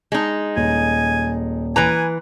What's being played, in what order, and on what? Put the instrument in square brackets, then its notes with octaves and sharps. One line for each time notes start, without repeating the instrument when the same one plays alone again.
[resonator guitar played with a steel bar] G#3 D#4
[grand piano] D#1 [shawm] G#5
[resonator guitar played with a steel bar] E3 B4 A#5 [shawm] G#5